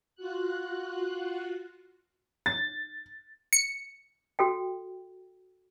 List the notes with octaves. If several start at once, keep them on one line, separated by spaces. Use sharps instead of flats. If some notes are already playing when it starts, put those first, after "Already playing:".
F4 F#4 F#6
A6
C#7
F#4 A4 G5